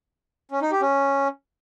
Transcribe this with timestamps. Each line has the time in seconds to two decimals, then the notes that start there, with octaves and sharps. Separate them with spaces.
0.51 C#4
0.61 D#4
0.71 G4
0.82 C#4